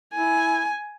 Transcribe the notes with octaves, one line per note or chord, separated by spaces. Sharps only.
E4 G#5